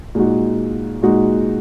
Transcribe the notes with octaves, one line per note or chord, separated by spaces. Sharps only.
A#2 G#3 D#4 F#4
A#2 G#3 D#4 F#4